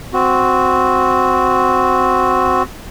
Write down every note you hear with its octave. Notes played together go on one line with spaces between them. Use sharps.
C4 F#4